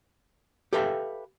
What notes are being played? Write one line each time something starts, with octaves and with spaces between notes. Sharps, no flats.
G4 A4 B4 E5 F5 G5